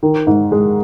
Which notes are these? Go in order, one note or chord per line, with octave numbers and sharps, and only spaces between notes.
D#3
G#2
G#3